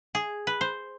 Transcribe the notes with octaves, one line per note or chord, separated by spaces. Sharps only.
G#4
B4
C5